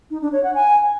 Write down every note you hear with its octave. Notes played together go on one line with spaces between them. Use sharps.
D#4
D4
C#5
F#5
G#5